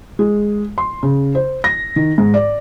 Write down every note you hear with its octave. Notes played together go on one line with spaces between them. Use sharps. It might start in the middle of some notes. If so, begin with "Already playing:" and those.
G#3
C6
C#3
C5
A#6
D#3
G#2
D5